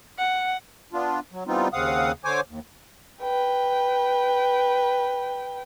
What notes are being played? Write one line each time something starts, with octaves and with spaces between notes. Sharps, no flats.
F#5
B3 D4 F4
F#3
E3 G3 B3 C4 D#4 F4
D#2 C#3 C4 F5 F#5 D#6
D3 C5 C#5 G#5 D6
D#2
B4 G5